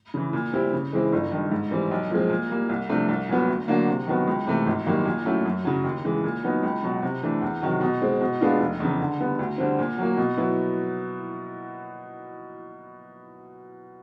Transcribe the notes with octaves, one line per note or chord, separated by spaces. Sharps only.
C#3 E3
A#2
G3 C4 E4 G4
C#3
E3 G#3 C4 E4
G1
G2 D#3
G#2
E3 G3 C4
B1
A#2 F3 G#3 C4
A#2
G3 A#3
C2
C3 F3 A3 D4
C2
A#2 F#3 B3
D2
D3 F#3 A#3 D4
C3
D#3 F#3 B3
C#2
C3 E3 A3
G#1
F#2 D#3 G3 A#3
A#2
F#3 A3 C#4 E4
F#2
C#3 F#3
D#2
C#3 E3 G#3
A#2
F#3 B3 D#4
C#2
B2 F#3
C3
E3 A3 D4
E2
C3 D#3 F#3
B2
G#3 C4
B2
G#3 B3 D4 F4
F1
E2 C#3
D3
G3 B3
D2
D3 G3 C4
A#2
F#3 A#3
B2
F#3 B3 E4